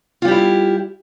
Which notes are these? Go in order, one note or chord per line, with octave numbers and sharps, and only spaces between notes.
G3 E4 F4 G4